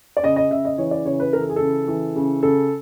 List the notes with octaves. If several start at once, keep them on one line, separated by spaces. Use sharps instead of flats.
D5
C#3 D#5
D#5
C#3 E5
D#5
E3 C#5
D5
C#3 C#5
B4
E3 A#4
A4
G#4
C#3 A4
E3
C#3
C#3 A4